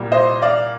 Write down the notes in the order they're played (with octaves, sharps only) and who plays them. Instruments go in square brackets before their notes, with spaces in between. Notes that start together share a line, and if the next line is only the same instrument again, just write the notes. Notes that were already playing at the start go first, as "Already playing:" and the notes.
Already playing: [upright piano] C2 A#2 G3
C5 D#5
D5 F5